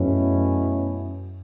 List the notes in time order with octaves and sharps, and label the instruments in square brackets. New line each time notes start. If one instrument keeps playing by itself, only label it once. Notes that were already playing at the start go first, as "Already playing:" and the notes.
Already playing: [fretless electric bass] F#2 [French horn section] B2 A3 C#4 E4